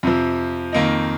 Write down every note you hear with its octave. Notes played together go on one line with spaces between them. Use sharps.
F2 C3 F3
F2 D#3 A#3 D#4